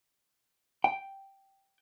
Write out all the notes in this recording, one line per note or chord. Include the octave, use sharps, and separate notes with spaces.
G5